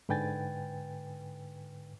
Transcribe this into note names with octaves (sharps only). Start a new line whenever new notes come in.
G#2 D3 B4 G5 G#5 A6